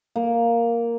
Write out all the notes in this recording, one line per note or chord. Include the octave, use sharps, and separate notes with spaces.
A#3